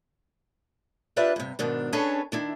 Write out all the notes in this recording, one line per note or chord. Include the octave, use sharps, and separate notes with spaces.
D4 F4 G4 B4 D5 E5
G2 C3
G#2 B2 D#3 D4
C#4 D4 G#4 A4 B4 C#5
D#3 D4 E4